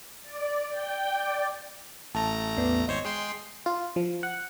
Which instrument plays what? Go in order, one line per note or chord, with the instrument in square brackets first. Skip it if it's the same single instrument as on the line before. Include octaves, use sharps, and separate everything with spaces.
[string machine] D5
G5
D5
[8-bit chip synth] A1 A3 A#5 [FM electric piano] A5
[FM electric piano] E2 B3 D5
[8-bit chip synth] G#1 C5 C#5 [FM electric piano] D#5
[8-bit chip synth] G#3 G5 C6 [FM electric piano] C7
[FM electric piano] F4
F3
F#5